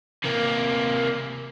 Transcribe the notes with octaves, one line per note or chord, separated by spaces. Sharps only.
C3 A#3